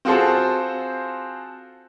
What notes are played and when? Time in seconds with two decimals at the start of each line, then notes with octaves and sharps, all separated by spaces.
0.05 C4 F4 F#4 G#4 A4 C5